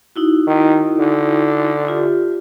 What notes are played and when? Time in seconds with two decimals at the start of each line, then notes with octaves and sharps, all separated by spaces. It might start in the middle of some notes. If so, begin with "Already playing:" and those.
0.16 D#4 E4 F#4
0.47 D#3
1.00 D3
1.88 F4 G4 E5